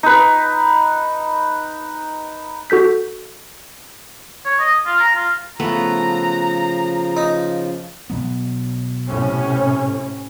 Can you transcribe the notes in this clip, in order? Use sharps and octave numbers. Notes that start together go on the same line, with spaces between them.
D#4 B4
F#4 A4 G6 B6
C#5
D#5
F4
A#5
F4
C#3 F3 A3 B3 F4 B4 A#5
D#4
B2 F#3 B3
A2 C3 C#4